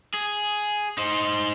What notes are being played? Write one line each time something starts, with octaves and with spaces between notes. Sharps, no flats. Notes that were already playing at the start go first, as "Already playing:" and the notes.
G#4
D#4 C5